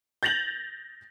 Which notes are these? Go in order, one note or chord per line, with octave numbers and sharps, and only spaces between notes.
G6 A6 A#6 F7 F#7